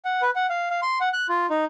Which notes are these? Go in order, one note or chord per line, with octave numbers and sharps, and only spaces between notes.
F#5
B4
F#5
F5
F5
C6
F#5
F#6
F4
D#4